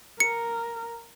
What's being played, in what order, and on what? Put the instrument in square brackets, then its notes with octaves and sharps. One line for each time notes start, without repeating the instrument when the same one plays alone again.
[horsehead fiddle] A#4 [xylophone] C#7